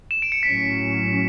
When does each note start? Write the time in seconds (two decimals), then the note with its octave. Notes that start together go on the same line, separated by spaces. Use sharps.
0.11 E7
0.22 D7
0.32 C#7
0.43 A2 F#3 C#4 B6